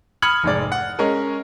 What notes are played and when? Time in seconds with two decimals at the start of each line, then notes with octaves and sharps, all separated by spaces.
0.22 B5 D#6 F6 G#6 C#7 F#7
0.43 F1 G#2 D5
0.72 F#5
0.99 G#3 C#4 A#4 C#5